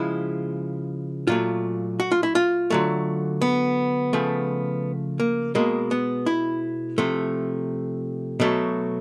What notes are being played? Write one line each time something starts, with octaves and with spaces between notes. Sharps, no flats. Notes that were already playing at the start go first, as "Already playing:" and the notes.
Already playing: C#3 F3 G#3 E4
A#2 F#3 A3 F4
F#4
F4
E4
F4
D3 F#3 A3
B3
C#3 F3 A3
A#3
B2 G#3 A#3
B3
E4
C3 F3 A3
B2 F#3 A3